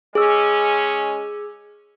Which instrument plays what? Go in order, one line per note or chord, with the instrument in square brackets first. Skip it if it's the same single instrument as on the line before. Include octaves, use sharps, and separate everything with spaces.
[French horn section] G#3 C#4 [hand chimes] G#4 E6